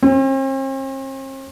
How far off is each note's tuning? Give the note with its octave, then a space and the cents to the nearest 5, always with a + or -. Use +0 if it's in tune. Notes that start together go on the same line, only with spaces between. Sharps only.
C4 +45